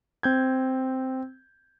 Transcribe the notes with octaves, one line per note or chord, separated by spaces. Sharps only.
C4 G6 G#6